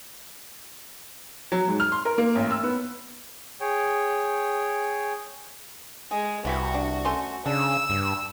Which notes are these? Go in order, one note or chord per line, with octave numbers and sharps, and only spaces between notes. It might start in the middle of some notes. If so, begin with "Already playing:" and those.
F#3
G#2
F6
C6
A#4
A#3
A1
E6
B3
G#4 C#5 G5
G#3 G#4
C2 E3 E4 F#4 G4
D4
A3 C#4 C6
C#3 D4 E6
G2